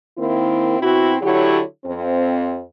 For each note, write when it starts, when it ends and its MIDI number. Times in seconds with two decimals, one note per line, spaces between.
0.18 0.79 51
0.18 0.79 58
0.18 0.79 60
0.18 0.79 64
0.80 1.15 47
0.80 1.15 60
0.80 1.15 64
0.80 1.15 66
1.22 1.60 50
1.22 1.60 54
1.22 1.60 64
1.22 1.60 67
1.22 1.60 73
1.85 2.61 41
1.85 2.61 60